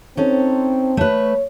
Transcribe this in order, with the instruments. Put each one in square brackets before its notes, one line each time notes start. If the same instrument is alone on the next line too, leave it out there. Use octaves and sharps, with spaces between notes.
[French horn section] C4 [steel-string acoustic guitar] C#4 D#4 A4
[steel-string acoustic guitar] A3 B4 [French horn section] C#5